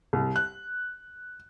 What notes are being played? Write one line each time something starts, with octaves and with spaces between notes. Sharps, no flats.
C2
F#6